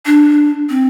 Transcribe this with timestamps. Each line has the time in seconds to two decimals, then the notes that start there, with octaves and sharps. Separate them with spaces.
0.06 D4
0.70 C4